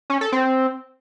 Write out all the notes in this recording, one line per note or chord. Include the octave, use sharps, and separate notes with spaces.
C#4
A4
C4